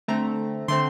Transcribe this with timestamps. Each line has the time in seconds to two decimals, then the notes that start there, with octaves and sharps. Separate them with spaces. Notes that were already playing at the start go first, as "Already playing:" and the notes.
0.08 D3 A3 C4 A#5
0.68 D3 A3 C4 C6